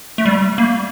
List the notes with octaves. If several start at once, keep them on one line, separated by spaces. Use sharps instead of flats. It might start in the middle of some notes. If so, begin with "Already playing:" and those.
A3
G3
A#3